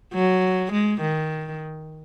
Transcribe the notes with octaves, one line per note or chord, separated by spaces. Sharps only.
F#3
G#3
D#3